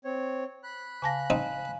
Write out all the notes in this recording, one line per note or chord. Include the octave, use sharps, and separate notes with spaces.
C4 C#5
B5 F#6
C#3 F5 G#5 A5 A#6
C4 D#4